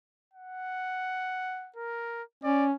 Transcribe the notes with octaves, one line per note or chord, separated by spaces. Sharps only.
F#5
A#4
C#4 D5